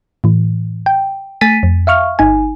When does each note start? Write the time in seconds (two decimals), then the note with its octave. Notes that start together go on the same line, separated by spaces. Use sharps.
0.24 A2 E3
0.86 G5
1.41 A3 G#5 A6 B6 D#7
1.63 F2
1.87 E5 F5 C#6 F6
2.19 G1 D#4 G#5